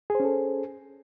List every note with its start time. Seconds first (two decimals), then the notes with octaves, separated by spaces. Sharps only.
0.10 G#4
0.15 C5
0.20 C#4
0.25 A4